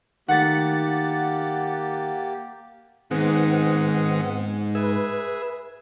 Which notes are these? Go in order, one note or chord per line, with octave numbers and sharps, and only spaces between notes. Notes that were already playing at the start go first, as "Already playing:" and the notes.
D#3 A3 A#3 G4 F#5 A6
G#2 D#3 G#3 B3 C4 F#5
G#4 B4 E5